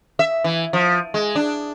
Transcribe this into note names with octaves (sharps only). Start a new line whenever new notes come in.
E5
E3
F3
G#3
D4